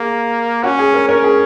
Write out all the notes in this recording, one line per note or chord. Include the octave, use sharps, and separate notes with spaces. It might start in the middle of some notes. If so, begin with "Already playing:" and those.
Already playing: A#3 G#4
C#4 F#4
G#4
A#4
C#4 A#4
G#4